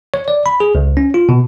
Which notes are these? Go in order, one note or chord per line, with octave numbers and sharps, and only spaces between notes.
C#5
D5
B5
G#4
C#2
C#4
F4
B2